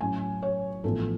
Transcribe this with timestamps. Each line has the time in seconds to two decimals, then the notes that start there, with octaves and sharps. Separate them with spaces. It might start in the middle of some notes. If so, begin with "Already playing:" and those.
0.01 A2 F#3 C#4 G#5
0.43 C#5
0.84 A1 A2 F3 B3 F4 A4